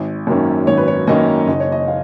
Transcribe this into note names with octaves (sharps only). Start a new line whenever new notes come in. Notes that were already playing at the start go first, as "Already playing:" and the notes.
Already playing: G#1
F#2 D#3 A#3 C#4
G#1 C#5
B4
C#5
F#2 D#3 A#3 C#4 D#5
F#1 D#5
C#5
D#5
F5